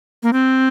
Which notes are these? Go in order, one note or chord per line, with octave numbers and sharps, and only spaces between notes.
A#3
C4